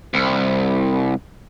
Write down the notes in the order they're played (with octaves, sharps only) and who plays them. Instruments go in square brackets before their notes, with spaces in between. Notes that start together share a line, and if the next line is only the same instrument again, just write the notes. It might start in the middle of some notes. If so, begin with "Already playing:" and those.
[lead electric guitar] C2